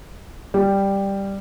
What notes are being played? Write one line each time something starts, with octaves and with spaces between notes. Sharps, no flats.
G3